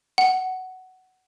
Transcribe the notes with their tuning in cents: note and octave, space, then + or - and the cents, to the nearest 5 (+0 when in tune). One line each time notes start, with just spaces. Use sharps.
F#5 +10